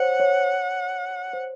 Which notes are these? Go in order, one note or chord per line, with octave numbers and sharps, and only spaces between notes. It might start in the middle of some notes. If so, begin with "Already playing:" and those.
Already playing: C5 C#5 F#5
C#5
C5